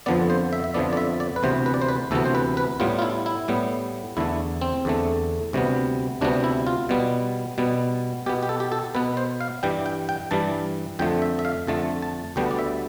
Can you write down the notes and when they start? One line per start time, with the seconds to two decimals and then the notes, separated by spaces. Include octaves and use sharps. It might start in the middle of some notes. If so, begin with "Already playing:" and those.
0.06 F2 D3 F3 B3 D5
0.30 C5
0.53 E5
0.64 E5
0.74 F2 D3 F3 B3 D5
0.93 D5
0.97 E5
1.20 D5
1.36 B4
1.43 D2 C3 E3 B3 C5
1.66 B4
1.74 D5
1.82 C5
1.88 B4
2.11 D2 C3 E3 B3 A4
2.25 C5
2.35 B4
2.57 B4
2.80 A2 G3 B3 F4
2.99 F4
3.02 E4
3.26 E4
3.48 A2 G3 B3
4.17 E2 D3 A3 E4
4.61 C4
4.85 E2 D3 A3
5.53 D2 C3 G3 B3
6.21 D2 C3 G3 B3 D4
6.44 E4
6.67 F4
6.89 B2 G3 B3
7.58 B2 G3 B3
8.26 B2 G4
8.29 B3
8.43 G4
8.49 A4
8.60 G4
8.72 A4
8.95 B2 B3 B4
9.17 C5
9.41 F5
9.63 G2 E3 G3 G5
9.86 G5
10.09 G5
10.31 G2 E3 G3 A5
10.99 F2 D3 A3 G5
11.22 E5
11.39 E5
11.45 F5
11.67 F2 D3 A3 A5
12.02 A5
12.36 D2 D3 G3 B3 G5
12.51 D5
12.59 E5